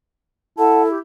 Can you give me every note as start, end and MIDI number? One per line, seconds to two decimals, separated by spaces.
0.58 0.99 64
0.58 0.88 69
0.58 0.81 78
0.58 0.81 81
0.89 0.98 67